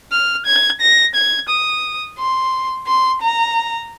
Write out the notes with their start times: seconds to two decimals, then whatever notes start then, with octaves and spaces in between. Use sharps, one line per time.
0.12 F6
0.46 G#6
0.81 A#6
1.15 G#6
1.49 D#6
2.19 C6
2.87 C6
3.22 A#5